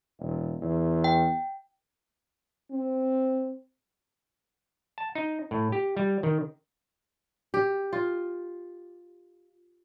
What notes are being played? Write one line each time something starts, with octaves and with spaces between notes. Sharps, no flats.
E1
E2
G5
C4
A5
D#4
A2
G4
G3
D#3
G4
F4